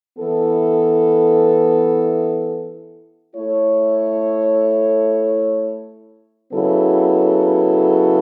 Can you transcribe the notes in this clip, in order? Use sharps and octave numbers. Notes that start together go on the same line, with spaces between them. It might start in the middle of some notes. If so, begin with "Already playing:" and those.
E3 B3 E4 A4
A3 E4 A4 C#5
C#3 F#3 B3 E4 A4